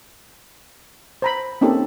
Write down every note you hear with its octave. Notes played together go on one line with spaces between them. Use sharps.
C5 A#5 B5
A#3 C4 C#4 D#4 G4 A4